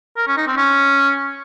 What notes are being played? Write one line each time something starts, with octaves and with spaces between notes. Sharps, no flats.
A#4
C#4
D#4
C4
C#4